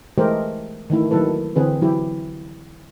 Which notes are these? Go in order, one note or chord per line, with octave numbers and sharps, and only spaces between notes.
E3 G#3 A3 G4 A#4 C5
D#3 E3 A3 E4
D#3 F#3 A#3 E4 A4 B4
D3 E3 C4 G#4 B4
E3 F#3 E4 G4